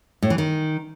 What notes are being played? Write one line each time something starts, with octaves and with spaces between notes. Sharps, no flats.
A2
E3
D#3